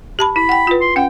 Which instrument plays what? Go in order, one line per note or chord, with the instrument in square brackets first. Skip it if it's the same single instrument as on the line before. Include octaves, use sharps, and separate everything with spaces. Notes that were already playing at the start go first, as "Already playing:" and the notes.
[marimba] G4 A5 B5
[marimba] E4 [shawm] B5
[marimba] F#5 G5
F4 B4
[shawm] C6
[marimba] C#4 F#5 [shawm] G5